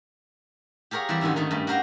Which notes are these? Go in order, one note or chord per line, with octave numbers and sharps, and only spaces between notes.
G4 G#4 A#4 C#5 F5
E3 G3 C4 D5 E5
G#2 D3 D#3 C#4
G#2 D#3 A3 D#4
G2 A3
F#4 G4 A#4 F5 G5